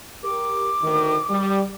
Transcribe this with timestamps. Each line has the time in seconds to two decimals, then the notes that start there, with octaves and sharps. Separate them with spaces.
0.24 G4 A#4 D6
0.82 D2 D#3
1.29 G3